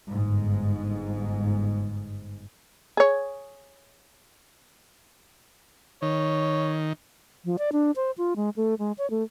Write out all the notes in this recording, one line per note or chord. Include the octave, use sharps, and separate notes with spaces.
G1 G#2
G#4 C#5
D#3 C#5
F3
D5
D4
C5
F4
G#3
A3
G#3
C#5
A3